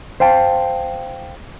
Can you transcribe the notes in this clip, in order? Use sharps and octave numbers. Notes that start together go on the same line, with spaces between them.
C5 F5 G5 A5